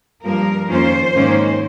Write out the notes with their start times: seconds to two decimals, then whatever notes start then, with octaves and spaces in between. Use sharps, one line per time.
0.24 G2 F3 A#3 A#4
0.69 F2 D#3 A#3 C#4 F4 C5
1.15 G#2 D#3 A#3 C#4